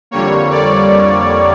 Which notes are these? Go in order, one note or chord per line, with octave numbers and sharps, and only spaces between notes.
F2 D3 G3 A#3 C#5
D5